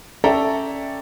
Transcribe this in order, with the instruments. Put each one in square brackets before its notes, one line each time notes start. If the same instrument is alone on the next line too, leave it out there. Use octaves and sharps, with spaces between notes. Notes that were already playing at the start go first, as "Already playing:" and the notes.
[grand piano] C#4 A4 D5 E5 G5 A#5